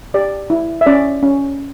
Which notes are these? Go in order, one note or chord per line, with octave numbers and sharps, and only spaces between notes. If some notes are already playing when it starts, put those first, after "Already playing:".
G4 D5
E4
E5
C#4 D5
C#4